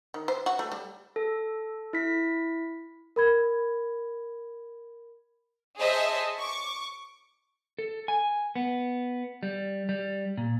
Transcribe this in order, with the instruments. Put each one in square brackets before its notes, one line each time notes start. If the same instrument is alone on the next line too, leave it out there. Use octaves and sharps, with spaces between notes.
[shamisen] D#3
C5
F#4
A3
G3
[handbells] A4
E4 B6
[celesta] A#4 B5 G#6
[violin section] G#4 C5 C#5 D#5 E5 A5
C#6 D6
[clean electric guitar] A4
G#5
B3
G3
G3
A#2